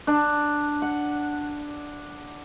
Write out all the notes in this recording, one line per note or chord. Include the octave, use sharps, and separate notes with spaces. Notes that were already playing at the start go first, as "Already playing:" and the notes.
D4
F#5